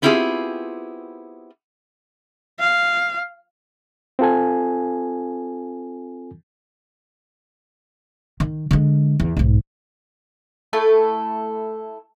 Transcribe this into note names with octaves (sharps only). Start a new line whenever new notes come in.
B3 C4 E4 F4 G4 G#4
F5
C4 F4 A4 G#5
D#3
D3 G#3
E2
B1 G#2
A3 E4 A4 A5